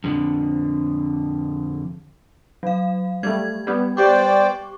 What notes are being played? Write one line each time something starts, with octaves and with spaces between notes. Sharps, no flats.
F2 D3
F#3 F5
G3 A3 G#6
G3 B3
G4 C5 D5 G5 C#6 D6